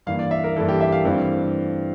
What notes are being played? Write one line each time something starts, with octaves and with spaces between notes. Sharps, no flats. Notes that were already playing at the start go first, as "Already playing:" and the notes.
G2 E3 A#3 F5
D5
E5
A#4
G2 E3 A#3 A4
G4
E5
F5
G2 E3 A3 C4